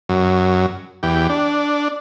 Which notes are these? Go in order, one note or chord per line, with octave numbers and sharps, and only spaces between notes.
F#2
E2 G4
D4